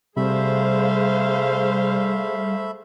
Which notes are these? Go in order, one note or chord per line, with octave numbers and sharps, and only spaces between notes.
C3 G3 A3 G#4 C5 E5 F5 B5